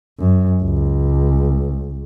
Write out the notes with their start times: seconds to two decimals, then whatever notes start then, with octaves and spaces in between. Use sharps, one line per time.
0.20 F#2
0.63 C#2